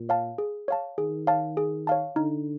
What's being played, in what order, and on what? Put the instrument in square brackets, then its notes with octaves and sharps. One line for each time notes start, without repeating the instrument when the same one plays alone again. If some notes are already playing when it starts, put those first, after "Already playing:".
Already playing: [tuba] A#2
[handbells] C#5 F5 A5
G#4
C#5 F5 A5
[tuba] D#3 [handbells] G#4
[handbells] C#5 F5 A5
G#4
C#5 F5 A5
[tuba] D3 [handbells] D#4